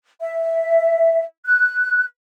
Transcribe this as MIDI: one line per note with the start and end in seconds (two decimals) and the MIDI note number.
0.20 1.24 76
1.45 2.05 90